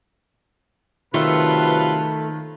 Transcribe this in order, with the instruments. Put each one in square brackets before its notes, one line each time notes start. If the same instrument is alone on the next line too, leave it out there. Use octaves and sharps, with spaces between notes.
[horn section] C3 F#3 B4 [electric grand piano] D#3 [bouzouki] A3 [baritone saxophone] F4